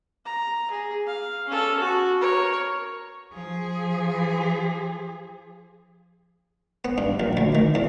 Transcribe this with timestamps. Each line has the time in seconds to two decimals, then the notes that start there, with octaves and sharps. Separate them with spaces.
0.25 A#5
0.71 G#4
1.06 F5
1.47 C#4 A4
1.80 F#4
2.21 A#4 C#5
3.33 F3 G#4
6.85 B3
6.98 G2
7.20 A#1
7.37 D2
7.55 D#3
7.75 E2